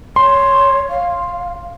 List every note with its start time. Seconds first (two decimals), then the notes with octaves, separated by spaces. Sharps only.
0.16 C#5 C6
0.89 F5